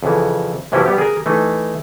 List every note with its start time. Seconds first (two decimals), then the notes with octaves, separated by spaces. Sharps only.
0.03 F2 C#3 E3
0.72 F#2 C3 E3 F3 C#4 E4
0.85 G3 B3 G4
0.98 G#4 A#4
1.26 E3 A3 D#4